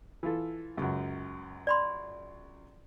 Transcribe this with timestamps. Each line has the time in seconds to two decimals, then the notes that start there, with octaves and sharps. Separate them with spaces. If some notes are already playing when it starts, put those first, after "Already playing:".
0.23 E3 F4 A4
0.77 C#2 F#2
1.67 D5 B5 C6